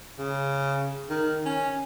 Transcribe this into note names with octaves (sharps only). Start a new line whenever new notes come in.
C#3
D#3
C#4